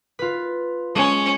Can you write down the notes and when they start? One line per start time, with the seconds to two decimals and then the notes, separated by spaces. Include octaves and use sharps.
0.19 F4 B4
0.95 G#3 C#4